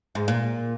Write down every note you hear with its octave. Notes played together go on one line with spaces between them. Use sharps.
G#2
A#2